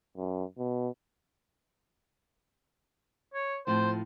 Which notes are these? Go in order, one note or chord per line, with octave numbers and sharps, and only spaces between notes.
F#2
B2
C#5
A2 F3 C4 C5